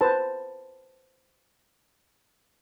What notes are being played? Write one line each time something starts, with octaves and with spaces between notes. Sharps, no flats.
B4 C5 A5